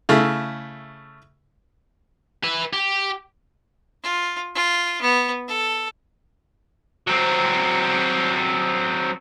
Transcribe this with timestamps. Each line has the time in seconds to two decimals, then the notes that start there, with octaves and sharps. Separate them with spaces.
0.09 C#3 A3 E4
2.44 B4 E5
2.73 G4
4.03 F4
4.55 F4
5.02 B3
5.48 A4
7.07 F#3 C4